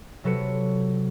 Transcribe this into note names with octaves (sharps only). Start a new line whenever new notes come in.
C3 F#3 A4 B4 C#7